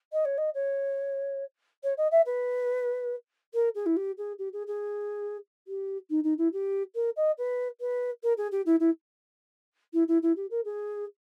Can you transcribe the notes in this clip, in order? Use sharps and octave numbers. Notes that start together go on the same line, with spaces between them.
D#5
C#5
D#5
C#5
C#5
D#5
E5
B4
A#4
G#4
E4
G4
G#4
G4
G#4
G#4
G4
D#4
D#4
E4
G4
A#4
D#5
B4
B4
A#4
G#4
G4
E4
E4
E4
E4
E4
G4
A#4
G#4